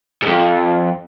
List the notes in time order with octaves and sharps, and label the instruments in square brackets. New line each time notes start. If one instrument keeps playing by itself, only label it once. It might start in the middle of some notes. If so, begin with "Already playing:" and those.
[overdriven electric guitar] F2 G#2